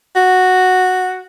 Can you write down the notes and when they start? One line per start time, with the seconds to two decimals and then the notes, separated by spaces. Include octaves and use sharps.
0.16 F#4